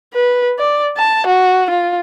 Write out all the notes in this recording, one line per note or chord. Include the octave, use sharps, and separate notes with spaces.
B4
D5
A5
F#4
F4